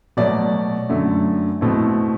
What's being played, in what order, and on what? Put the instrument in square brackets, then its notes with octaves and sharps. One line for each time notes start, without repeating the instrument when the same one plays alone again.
[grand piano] B2 F#3 A3 D5
F#2 D3 A3
B2 A3 C4 E4